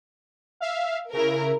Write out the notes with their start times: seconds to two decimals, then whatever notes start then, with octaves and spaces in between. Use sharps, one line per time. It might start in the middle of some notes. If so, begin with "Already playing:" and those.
0.60 E5 F5
1.13 C#3 E4 A#4